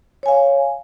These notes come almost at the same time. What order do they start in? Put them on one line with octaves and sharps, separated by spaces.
C#5 G#5 F5